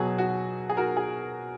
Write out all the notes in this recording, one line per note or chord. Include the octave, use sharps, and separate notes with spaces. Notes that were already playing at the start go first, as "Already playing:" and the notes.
Already playing: B2 F#3 G#4
F#4
G#4
F#4 A#4
G#4